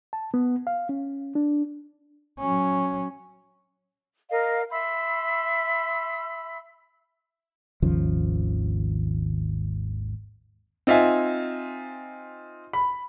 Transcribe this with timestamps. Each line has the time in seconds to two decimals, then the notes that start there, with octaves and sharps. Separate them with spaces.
0.13 A5
0.34 B3
0.67 F5
0.89 C#4
1.35 D4
2.39 F#3 C#4
4.30 A#4 D#5 F5
4.71 E5 B5 C6 E6
7.82 G#1 D#2 C#3 F3
10.87 C4 D#4 F4 E5 G#5
12.73 B5